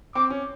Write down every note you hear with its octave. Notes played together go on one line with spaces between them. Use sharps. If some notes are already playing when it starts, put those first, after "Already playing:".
C4 D6
C#4